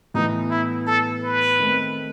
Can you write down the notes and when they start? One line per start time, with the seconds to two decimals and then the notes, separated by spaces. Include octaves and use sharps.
0.14 A2 E3 B3 D#4
0.51 E4
0.87 A4
1.24 B4
1.59 D#3 A3 C4